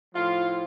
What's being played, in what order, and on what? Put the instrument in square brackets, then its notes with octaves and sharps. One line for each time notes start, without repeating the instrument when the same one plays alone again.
[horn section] A2 F3 F4